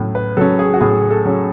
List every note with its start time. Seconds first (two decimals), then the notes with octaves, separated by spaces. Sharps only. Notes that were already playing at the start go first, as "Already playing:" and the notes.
Already playing: A2 F#3 C#4
0.15 B4
0.37 F#3 C#4 A4
0.59 G#4
0.74 F#4
0.81 A2 G#4
1.11 A4
1.25 F#3 C#4